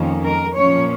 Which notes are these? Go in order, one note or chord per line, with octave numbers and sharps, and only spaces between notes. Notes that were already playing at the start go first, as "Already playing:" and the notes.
Already playing: F2 D#3 A#3 C#4
A#4
A#2 F3 C#4 C#5